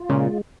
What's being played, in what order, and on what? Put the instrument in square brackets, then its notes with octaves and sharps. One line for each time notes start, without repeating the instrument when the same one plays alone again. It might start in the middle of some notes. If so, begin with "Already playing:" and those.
Already playing: [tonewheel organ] F4
[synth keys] A#2 C#3 [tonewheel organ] G#3